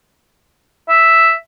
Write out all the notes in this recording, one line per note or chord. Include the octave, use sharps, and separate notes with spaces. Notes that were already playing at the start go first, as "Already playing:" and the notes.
E5